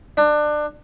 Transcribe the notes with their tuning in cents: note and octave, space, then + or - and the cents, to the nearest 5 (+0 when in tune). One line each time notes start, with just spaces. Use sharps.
D4 +25